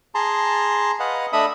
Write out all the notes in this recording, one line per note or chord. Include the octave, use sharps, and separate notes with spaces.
G#4 A5 A#5 C6
B4 D#5 F5 F#5
A3 D4 D#5 E5 B5 D#6